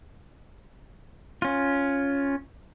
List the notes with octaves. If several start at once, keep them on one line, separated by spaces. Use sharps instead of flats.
C#4 F4